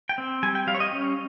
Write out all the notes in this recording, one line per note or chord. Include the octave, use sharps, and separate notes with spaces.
G5
C4
G3 G#5
G5
G3 F5
C#5
D#5
C#4